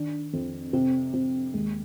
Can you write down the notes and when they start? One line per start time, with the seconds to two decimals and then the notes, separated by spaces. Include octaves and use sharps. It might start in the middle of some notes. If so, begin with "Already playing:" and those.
Already playing: D#3 D4
0.33 F2 C4
0.73 C3 C4
1.13 C3 C4
1.54 D#2 G#3